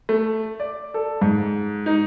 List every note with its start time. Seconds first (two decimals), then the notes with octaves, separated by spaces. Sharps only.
0.09 A3
0.60 D5
0.94 A4
1.22 G#2
1.86 D#4